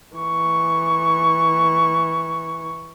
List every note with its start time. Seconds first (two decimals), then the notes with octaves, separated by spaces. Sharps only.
0.16 E3 C#6